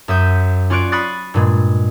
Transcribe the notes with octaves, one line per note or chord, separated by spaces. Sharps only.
F#2 E5 D#6 G6
C#4 F4 D5 C#6 F#6 D7
B5 C#6 D#6 F#6 A6 C7
G2 A#2 G#3